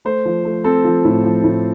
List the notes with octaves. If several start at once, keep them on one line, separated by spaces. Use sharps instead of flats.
A3 C5
F3
A3
C4 A4
F3
A2
F3
A2